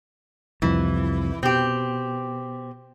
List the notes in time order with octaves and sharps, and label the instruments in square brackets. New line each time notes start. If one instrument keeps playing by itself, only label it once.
[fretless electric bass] C2 F2 [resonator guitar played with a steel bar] E3
[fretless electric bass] B2 [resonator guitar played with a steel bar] C4 G4